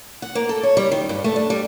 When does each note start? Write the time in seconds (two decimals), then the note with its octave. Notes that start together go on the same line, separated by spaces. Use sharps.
0.22 F#5
0.35 A#3
0.49 A4
0.63 C#5
0.77 G3
0.92 D#3
1.09 G2
1.24 A3
1.36 D4
1.50 G3